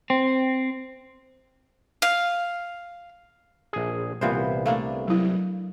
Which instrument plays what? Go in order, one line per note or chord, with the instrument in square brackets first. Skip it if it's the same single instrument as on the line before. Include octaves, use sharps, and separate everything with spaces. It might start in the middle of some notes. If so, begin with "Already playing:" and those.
[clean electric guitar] C4
[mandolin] F5
[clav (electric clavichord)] A#1 G#4
[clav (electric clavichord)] C2 B3 [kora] A#2 E3 C5
[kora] A3 A#3 D4 [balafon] F5
[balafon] F#3 E4